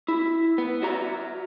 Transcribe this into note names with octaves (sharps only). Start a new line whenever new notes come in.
E4
B3
F#4 D5 E5 A#5